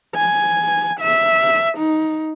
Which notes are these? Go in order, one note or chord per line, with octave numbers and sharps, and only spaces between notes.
G#5
E5
D#4